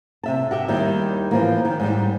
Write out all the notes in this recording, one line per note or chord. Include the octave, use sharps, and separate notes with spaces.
C3 E5 A5
F#4 G4 E5
D#2 D#3 G3 E4 G4
E3 F3 A#3
D#3
G#2 G3